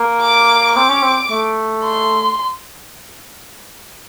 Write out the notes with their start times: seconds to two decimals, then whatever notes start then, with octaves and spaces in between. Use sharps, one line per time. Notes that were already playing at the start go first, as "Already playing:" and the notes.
Already playing: A#3
0.22 D6
0.75 C4 D6
0.89 C#4
1.02 C4
1.31 A3
1.84 C6